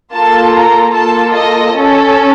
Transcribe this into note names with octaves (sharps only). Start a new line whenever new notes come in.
A#3 F4 A4 A5
A#5
A#3 F4 A4 A5
D#5
C#4 A4